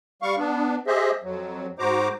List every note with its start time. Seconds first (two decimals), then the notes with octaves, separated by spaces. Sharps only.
0.22 G3 F5 C#6
0.38 B3 D4
0.87 G4 G#4 C5 D#5 E5
1.23 F2 F#3
1.79 G#2 F#4 C5 A#5 D6